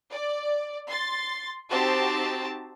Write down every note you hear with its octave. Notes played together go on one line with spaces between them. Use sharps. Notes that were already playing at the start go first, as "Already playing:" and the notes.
D5
C6 A6
C4 D#4 F#4 G4 C5 A5